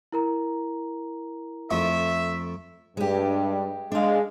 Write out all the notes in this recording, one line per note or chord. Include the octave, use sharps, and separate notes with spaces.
E4 A#4 A#5
F2 A3 E5
G2 G#3 G4
G#3 D4 F5